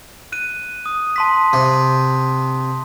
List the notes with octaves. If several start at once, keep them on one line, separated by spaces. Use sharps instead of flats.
F#6 D#7
D#6
A5 C6 B6
C3